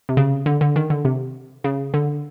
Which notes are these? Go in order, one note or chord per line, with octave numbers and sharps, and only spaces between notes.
C3
C#3
D3
D3
D#3
D3
C3
C#3
D3